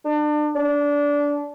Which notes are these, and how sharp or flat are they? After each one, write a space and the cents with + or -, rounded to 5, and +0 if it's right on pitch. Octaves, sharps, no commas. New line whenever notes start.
D4 +30
D4 -20